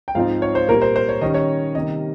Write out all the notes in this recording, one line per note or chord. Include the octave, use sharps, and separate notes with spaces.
G5
G#2 F3 C4 D#4 F5
C#5
C5
A#2 G3 A#3 A#4
C5
C5
C#5
D#3 G3 C#4 D#5
C#5
C3 D#3 G3 A#3 D#5